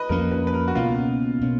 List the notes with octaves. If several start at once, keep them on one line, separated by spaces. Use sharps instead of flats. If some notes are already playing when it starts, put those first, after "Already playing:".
Already playing: B4 D#5
F2 F3 A#3 C#4 A#4
B4
B4
A#4
F#4
C#2 B2 A#3 C#4 F4
B2 A#3 C#4